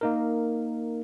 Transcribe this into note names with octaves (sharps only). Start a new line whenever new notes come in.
A#3 D#4 A#4